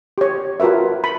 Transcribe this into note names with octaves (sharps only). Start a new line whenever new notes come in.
G4 C#5
F4 F#4 A#4 B4 E5
B5